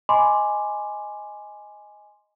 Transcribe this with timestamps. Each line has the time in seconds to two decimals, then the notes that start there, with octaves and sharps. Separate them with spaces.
0.09 D#5 G#5 B5 C6 D6